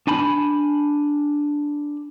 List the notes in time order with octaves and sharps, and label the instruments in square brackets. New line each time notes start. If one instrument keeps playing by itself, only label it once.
[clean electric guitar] D4 G#5 A5 B5